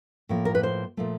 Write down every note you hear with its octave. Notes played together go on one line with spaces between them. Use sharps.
A2 F3 A#3
A#4
B4
C5
A#2 F3 A3